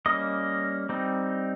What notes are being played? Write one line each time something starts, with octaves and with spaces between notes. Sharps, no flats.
G3 A#3 C#4 D#5
G3 C4 D#4